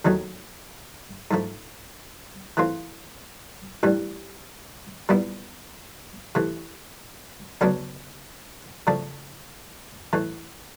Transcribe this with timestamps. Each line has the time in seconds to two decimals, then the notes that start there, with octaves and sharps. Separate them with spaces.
0.05 D#2 D#3 F#3 A3
1.31 G#2 F3 A3
2.57 E3 A3 C4 F4
3.83 A1 G2 E3 G3
5.09 A#2 G3 B3 E4
6.35 C3 E3 A3
7.61 D2 C#3 F#3 B3 D4
8.87 C#3 F3 A3 D4
10.13 A2 E3 A3